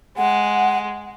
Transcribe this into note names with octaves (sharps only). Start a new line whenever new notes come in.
G#3 F#5